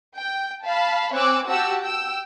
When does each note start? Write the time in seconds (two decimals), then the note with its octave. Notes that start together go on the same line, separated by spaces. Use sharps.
0.17 G5
0.65 F5 A5 B5
1.13 C4 C#5 G#5 D6 E6 F#6
1.48 F#4 G4 F#5 G5 A5 E6
1.81 G5 E6